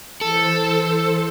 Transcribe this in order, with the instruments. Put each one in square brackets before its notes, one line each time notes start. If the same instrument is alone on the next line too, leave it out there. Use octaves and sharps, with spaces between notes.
[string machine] E3 C5 [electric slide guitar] A4